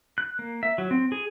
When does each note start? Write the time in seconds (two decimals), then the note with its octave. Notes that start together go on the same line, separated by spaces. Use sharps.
0.18 F#6
0.39 A#3
0.63 E5
0.78 F#3
0.91 C4
1.12 G#4